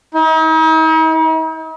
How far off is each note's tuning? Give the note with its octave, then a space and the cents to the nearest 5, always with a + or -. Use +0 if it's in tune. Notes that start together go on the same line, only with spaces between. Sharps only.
D#4 +45